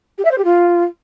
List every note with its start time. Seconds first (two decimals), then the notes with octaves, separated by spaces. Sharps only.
0.18 G4
0.24 E5
0.31 C5
0.37 G4
0.44 F4